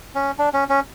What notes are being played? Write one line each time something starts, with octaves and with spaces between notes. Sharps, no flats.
C#4
D4
C#4
C#4